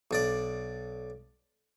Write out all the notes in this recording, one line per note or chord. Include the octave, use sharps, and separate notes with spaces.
B1 D4 D5